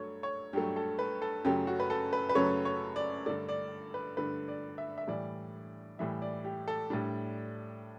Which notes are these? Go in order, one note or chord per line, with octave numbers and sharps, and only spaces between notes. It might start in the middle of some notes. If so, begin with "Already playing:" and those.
Already playing: G2 F#3 A3 C#5
C#5
G2 F#3 A3 G4
A4
B4
A4
F#2 C#3 F#3 A3 G4
F#4
B4
A4
B4
B4
F#2 C#3 F#3 A3 C#5
C#5
D5
G2 D3 A3 D5
D5
B4
G2 D3 A3 B4
D5
E5
E5
A2 E3 G3 D5
A2 E3 G3 E5
D5
G4
A4
A2 G3 D4